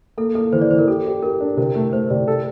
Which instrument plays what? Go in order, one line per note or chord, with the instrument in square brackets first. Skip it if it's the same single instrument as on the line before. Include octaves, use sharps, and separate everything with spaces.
[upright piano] A#3 [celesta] A4
[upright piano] A#3 [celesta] A4
[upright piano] E3 [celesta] C5
[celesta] D5
[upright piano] E3 [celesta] C5
[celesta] A#4
[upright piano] G4 [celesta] A4
[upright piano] G4
[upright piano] G4 [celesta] A#4
[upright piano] D4
[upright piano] C3 [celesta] A#4
[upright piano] A3
[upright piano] A3 [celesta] C5
[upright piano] C3 [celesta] D5
[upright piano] A4